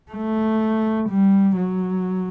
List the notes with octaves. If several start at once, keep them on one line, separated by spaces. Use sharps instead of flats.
A3
G3
F#3